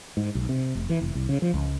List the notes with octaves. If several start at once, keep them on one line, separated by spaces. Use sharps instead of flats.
G#2
B1
C3
F1
E3
F1
C2
C#3
F3
C#2